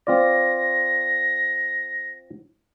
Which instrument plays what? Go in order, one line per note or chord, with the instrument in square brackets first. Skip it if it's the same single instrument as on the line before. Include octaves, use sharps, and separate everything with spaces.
[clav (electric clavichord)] C4 F4 D5 [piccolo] A#6